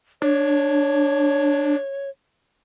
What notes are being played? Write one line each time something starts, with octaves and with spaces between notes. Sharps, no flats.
D4 C#5